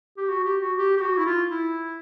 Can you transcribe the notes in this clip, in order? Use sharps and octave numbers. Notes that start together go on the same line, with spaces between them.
G4
F#4
G4
F#4
G4
G4
F#4
E4
F4
E4